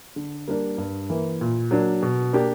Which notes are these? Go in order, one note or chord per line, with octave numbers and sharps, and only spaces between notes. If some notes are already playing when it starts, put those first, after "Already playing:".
D3
G3 A#3 D4 A#4
G2
E3 A#3
A#2
F#3 A#3 D4
B2
A#3 D4 G4